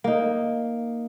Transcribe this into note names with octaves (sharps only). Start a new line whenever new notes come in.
A#3 D#4